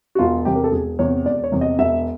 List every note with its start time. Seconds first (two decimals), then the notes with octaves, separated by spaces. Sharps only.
0.15 F#4
0.19 E1 F4
0.45 E2 C3 G4
0.56 A#4
0.64 A4
0.72 E1 G#4
0.99 E2 C3 C#5
1.26 E1 D5
1.44 C#5
1.52 E2 C3
1.61 D#5
1.79 E1 E5